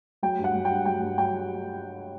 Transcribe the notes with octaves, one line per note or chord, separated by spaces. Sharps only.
F#3 G5
G2
F#5
F#3
G5
G2
F#3 G5
G2
F#3 G5